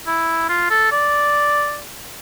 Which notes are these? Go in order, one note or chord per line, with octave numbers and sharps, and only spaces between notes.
E4
F4
A4
D5